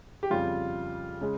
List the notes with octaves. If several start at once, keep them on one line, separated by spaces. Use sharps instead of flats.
G4
F2 C#3 G3 F4
C#3 G#3